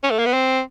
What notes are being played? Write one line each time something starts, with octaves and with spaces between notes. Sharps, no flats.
C#4
A3
A#3
B3
C4